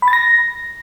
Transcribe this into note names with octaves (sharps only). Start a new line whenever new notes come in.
B5
A6
A#6